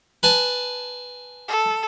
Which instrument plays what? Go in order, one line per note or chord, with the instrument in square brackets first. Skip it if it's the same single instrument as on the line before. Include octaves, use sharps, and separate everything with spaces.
[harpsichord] B4 G#5 A5
[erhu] A4